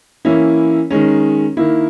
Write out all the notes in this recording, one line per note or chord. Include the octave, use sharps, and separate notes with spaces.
E3 A#3 C#4 E4
D#3 G#3 C#4
D#3 A#3 E4